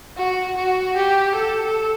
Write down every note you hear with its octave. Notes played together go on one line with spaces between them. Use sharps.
F#4
F#4
G4
A4